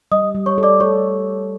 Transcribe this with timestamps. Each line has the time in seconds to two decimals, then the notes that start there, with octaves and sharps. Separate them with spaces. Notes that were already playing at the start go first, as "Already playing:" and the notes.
0.11 G3 D#5 D#6
0.35 G3
0.46 C#5 C#6
0.58 A4
0.63 D5 D6
0.80 A4 C#5 C#6